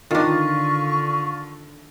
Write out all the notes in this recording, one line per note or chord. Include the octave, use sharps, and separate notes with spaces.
D3 D#3 D4 F4 C#6